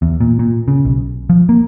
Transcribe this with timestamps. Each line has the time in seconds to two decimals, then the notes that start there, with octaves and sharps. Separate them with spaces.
0.02 E2
0.21 A#2
0.39 A#2
0.68 C#3
0.85 B1
1.30 F3
1.49 A#3